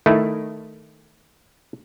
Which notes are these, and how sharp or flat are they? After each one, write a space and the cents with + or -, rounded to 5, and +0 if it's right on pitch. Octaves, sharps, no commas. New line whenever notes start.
D#3 +0 A3 +0 E4 +0